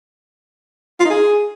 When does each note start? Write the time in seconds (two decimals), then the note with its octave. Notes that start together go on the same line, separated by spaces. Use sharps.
1.00 F4
1.05 D#4
1.11 G#4